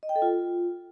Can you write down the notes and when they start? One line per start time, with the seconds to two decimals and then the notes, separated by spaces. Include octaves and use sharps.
0.03 D#5
0.09 G5
0.16 A4
0.22 F4